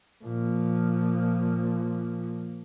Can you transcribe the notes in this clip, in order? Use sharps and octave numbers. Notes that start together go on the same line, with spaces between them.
A#2 F3